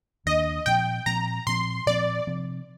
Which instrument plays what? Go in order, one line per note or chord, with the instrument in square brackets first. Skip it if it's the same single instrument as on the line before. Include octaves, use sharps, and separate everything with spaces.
[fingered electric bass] D#2 D#3 A#3 D4 [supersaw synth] D#5
[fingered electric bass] A#2 F3 C4 [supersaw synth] G5
[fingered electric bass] A#2 F3 C4 [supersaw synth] A#5
[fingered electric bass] A#2 F3 C4 [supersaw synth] C6
[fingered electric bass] A#2 F3 C4 [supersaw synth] D5
[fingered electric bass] C3 F3 C4